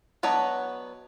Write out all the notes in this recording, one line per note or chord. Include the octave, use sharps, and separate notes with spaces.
F#3 B3 D4 C#5 D#5